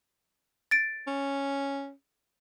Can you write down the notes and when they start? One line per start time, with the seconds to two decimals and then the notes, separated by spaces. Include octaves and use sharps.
0.71 A6 D7
1.07 C#4